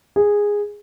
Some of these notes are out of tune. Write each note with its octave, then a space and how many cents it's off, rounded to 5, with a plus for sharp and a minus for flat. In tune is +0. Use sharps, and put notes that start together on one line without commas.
G#4 -10